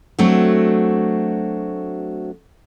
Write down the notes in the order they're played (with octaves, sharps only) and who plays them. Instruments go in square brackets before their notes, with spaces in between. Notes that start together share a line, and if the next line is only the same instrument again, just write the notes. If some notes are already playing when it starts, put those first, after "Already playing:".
[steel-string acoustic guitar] F#3 A3 C4 D4 F#4